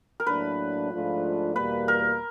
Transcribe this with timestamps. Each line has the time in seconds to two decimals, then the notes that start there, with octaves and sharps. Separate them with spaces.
0.20 A#4
0.27 A2 F#3 A#3 D4 B4
0.91 G#2 F3 A3 D4 F4
1.55 E2 B2 G3 A#3 B4
1.88 A#4